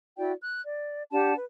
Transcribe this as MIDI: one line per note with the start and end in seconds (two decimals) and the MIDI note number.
0.18 0.32 64
0.18 0.32 66
0.18 0.32 74
0.18 0.32 79
0.42 0.62 90
0.64 1.03 74
1.12 1.34 62
1.12 1.34 67
1.12 1.34 78
1.12 1.34 81
1.36 1.44 71